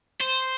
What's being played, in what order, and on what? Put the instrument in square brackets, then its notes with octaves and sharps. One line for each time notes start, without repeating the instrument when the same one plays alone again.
[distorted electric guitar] C5